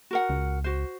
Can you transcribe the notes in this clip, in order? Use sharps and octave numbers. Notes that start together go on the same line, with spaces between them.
F#4 A#4 F#5
C#2
F#4 C5